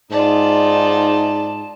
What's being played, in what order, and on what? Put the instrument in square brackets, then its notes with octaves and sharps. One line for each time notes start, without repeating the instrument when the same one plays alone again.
[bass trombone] G#2 [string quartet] D#4 F4 [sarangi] D5 [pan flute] A5